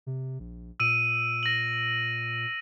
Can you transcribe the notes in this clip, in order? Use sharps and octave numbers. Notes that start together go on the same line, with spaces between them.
C3
A#1
A#2 E6 D7 D#7
A#6 F#7